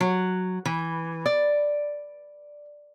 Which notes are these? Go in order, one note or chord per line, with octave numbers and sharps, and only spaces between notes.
F#3
E3
D5